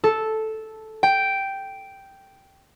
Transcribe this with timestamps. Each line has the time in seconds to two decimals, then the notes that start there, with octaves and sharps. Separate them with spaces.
0.04 A4
1.03 G5